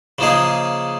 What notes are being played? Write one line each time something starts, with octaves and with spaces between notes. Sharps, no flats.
C#3 F3 A#3 D#4 G#4